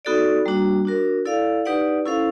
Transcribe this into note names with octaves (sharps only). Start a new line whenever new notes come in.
B3 D#4 F#4 A4 D5
G3 A#3 D4 F#4
D4 F#4 A#4
E4 A4 D5 F5
D#4 G4 B4 D5 F#5
C#4 E4 A4 C5 F5